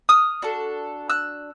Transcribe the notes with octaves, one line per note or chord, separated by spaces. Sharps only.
D#6 F6
D4 F#4 A4
E6 F#6